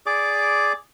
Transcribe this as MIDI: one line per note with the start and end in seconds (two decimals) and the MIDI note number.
0.06 0.73 68
0.06 0.73 74
0.06 0.73 86